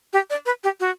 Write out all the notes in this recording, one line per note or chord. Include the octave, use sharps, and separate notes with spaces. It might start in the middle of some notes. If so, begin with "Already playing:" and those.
G4
D5
B4
G4
F#4